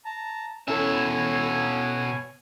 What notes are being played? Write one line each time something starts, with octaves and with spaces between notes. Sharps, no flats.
A5 A#5
B2 C#4 E4 A4 C#5 E5 G#5